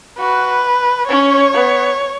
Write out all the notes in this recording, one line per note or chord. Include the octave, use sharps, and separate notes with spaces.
F#4 B4
C#4 C#5
B3